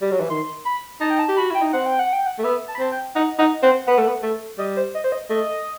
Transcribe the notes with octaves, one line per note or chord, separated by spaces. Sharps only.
G3
F#3
E3
D#3 C6
B5
D#4 A5
G5
A5
G4
F#4 B5
E4 G5
D#4
C4 F#5
G5
F#5
G5
F#5
A3
B3 E5
A5
B5
C4 A5
G5
D#4 F#5
D#4 F#5
C4 F#5
B3 F#5
A3
B3
A3
G3 D#5
C5
D#5
C5
D#5
A3 D#5